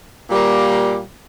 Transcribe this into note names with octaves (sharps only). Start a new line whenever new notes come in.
A#2 G3 A#3